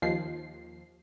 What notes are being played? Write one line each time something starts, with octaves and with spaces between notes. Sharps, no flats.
D#2 F3 C7